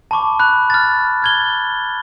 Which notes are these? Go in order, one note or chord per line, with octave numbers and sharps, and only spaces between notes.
A5 B5 C#6 D6
B5 F#6
F6 A6
F6 G#6 G7